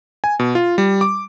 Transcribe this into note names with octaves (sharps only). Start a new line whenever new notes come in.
G#5
B2
F4
G3
D6